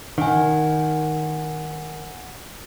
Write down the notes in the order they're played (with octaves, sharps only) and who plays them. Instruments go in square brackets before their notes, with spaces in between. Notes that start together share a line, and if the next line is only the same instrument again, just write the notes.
[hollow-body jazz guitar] D#3 [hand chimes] F#5 G#5